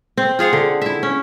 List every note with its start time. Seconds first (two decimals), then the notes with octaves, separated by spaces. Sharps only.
0.17 C4
0.39 F4 G#4 F5 F#5
0.53 D3
0.82 E4 E5
1.03 C#4